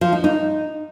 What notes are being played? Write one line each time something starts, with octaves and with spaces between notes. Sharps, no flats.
F3
D#4
D#4